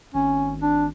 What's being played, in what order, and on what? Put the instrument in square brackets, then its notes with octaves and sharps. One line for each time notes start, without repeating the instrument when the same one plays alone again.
[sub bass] G#1 [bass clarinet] C#4
[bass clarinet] D4